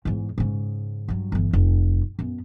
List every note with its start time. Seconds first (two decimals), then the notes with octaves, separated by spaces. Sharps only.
0.05 E2 G#2
0.38 G#2 C#3
1.08 G2 F#3
1.32 G1 E3
1.53 F1
2.19 F#2 B3